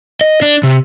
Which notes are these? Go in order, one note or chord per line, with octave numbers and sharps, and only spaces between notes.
D#5
D4
C3